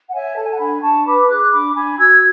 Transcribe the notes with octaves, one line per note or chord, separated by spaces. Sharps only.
F#5
C#5 E5 G#5
A4 A5
G#5
F#5 A5
D4 G#5 B5
D4 A5 C#6
B4 B5 D6
G#4 D6 F#6
D4 B5 D6
D4 G#5 B5
F#4 E6 G#6